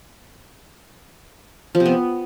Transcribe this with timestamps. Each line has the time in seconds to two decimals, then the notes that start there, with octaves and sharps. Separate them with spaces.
1.75 F3
1.80 C3
1.86 B3